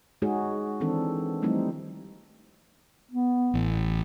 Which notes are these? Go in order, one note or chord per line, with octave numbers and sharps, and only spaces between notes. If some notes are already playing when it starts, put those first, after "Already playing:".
G#3 D#4 F#4 G#4 C#5
D#3 E3 C4 D4 A4
F3 G3 A3 C4 D#4 E4
B3
A1